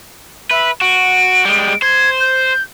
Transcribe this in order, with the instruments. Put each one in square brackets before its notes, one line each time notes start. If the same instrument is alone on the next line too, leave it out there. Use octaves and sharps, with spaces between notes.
[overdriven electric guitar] B4 [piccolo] E5
[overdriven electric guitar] F#4 [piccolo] D7
[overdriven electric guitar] G3 G#3
[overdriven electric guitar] C5 [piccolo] G#6
[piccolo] G6